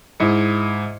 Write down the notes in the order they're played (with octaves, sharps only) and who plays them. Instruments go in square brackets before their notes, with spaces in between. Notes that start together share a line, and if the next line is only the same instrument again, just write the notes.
[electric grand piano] G#2 E4 D#5 C#7